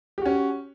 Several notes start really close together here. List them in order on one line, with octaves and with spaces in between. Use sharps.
G4 F#4 C#4